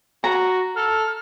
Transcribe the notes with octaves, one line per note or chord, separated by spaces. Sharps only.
F#4 A#5
A4 F6